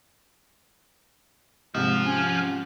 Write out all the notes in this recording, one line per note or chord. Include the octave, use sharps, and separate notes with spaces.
G#2 C3 F3
C#4